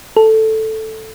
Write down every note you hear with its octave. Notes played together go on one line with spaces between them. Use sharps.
A4